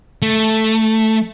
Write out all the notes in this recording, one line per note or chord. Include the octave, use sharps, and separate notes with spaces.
A3